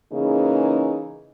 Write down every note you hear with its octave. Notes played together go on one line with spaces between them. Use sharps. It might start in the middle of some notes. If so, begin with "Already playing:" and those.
C#3 E3 A#3 D#4 G#4